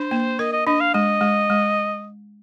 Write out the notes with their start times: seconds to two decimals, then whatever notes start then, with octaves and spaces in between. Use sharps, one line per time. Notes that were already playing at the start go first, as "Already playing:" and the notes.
Already playing: D4 C5
0.11 A#3
0.39 A#4 D#5
0.53 D#5
0.67 D4 D#5
0.80 F5
0.94 G#3 D#5
1.21 G#3
1.50 G#3